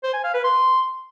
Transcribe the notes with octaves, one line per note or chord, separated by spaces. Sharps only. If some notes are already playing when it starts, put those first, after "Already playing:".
C5
G#5
F5
B4
C6